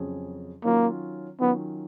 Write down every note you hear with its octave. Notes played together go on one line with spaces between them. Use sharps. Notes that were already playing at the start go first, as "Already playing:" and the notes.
Already playing: F2 C#3 F#3 C#4 G#4
D#3 F#3 A#3 C#4 F4
D#3 F#3 B3 C#4 F4